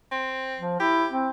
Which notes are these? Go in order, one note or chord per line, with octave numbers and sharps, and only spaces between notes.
C4
F3
E4 G4
C4